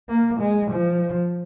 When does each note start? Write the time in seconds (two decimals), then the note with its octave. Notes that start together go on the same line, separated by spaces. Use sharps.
0.09 A#3
0.40 G#3
0.72 F3